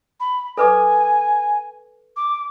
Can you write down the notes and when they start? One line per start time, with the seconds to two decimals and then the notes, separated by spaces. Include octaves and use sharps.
0.20 B5
0.57 A4 B4 G#5 D6
2.16 D6